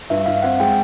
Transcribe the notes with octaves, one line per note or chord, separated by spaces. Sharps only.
G2 E5
G2 F5
C4 F#5
G#3 G5